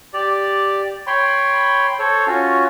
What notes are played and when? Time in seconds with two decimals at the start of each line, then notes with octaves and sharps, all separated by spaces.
0.14 G4 D5
1.07 C#5 G5 B5 C6
1.99 A4 C5 C#5
2.27 C#4 F4 F#4